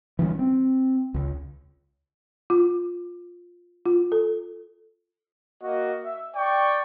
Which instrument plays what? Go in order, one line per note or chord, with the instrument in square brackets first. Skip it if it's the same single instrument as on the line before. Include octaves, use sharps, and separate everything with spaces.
[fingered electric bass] E3 G3 C4 C#4
C4
C#2
[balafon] F4
F4
A4
[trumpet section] A#3 F#4 D#5
E5
D5 G5 C#6